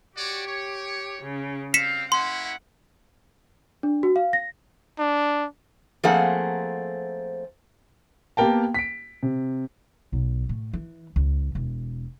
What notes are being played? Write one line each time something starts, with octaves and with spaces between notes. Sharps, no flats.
F#4 G4 C#5 D5
C#5
C#3
G3 C4 F5 B6 C#7 E7
A#3 C#4 E4 F#5 C6
D4
F#4
F5
A#6
D4
F3 A3 A#3 C4 G#4 F#5
A#3 B3 G4 A#4 G5 A5
B6 D7
C3
B1
A2
E3
C#2
E1